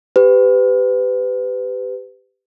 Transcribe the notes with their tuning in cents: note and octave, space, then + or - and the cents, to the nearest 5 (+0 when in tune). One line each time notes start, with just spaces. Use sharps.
G4 +5 B4 +30